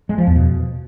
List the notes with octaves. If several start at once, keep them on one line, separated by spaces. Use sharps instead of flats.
G#3
F3
E2
B2